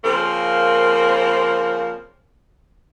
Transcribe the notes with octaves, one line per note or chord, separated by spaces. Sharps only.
C#3 F3 A#3 C4 A#4 C5